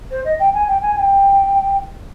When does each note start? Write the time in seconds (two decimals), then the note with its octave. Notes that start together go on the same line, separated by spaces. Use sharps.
0.11 C5
0.24 D#5
0.39 G5
0.54 G#5
0.67 G5
0.81 G#5
0.95 G#5
0.99 G5